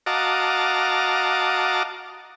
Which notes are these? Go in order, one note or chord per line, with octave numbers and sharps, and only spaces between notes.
F#4 D#5 F5 A5 A#5 D6